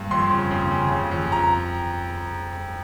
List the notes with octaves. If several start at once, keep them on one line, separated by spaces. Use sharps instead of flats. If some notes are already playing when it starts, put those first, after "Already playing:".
Already playing: G2
F2 C6
C#3
C#3
C#3
C#3
F2
A#5